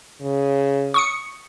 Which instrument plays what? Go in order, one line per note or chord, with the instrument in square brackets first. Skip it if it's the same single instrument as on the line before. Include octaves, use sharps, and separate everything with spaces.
[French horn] C#3
[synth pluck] C#6 D#6 C#7